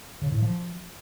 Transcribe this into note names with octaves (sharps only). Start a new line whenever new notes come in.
C#3
A2
F3